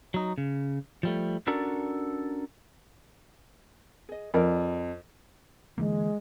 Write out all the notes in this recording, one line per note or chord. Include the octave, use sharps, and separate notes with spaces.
F#3 D#4
C#3
F3 G3 A3
C#4 D4 F#4 A4 A#4 D5
G#4 D#5
F2 A#4 D5 E5
D3 E3 G#3 A#3